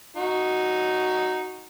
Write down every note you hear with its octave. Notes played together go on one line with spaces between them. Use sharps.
D#4 F#4